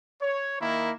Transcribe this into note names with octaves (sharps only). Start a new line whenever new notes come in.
C#5
D#3 A#3 E4